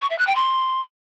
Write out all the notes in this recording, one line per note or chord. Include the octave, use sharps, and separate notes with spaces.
C#6
E5
F#6
G5
C6